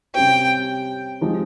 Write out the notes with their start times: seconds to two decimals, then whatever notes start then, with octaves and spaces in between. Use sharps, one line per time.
0.15 C3 G3 C#4 G4 C5 G5
1.21 F3 G#3 C4 D#4 G4